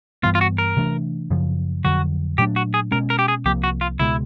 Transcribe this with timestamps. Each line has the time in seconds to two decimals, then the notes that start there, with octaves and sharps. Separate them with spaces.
0.23 G2 E3 G3 B3 F4
0.35 F4
0.41 F#4
0.58 A#4
0.77 C3 E3 A3 D4
1.30 F#2 C#3 F3
1.84 F2 D3 F#3 F#4
2.38 A#2 F#3 A3 D4 G4
2.56 F#4
2.74 G#4
2.92 B2 G#3 C#4 A#4
3.10 A#4
3.19 G4
3.28 G#4
3.45 C2 C3 F3 A#3 G4
3.64 F#4
3.81 F4
3.99 C#2 B2 G#3 E4